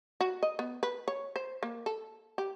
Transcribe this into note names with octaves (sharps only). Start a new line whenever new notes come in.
F#4
D#5
B3
B4
C#5
C5
A#3
A4
G4